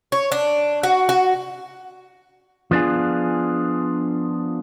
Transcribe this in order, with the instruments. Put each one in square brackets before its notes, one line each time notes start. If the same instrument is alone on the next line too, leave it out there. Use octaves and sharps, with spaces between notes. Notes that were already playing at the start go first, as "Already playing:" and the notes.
[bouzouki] C#5
D4
F#4
F#4
[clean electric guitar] F3 B3 D4 F4 G#4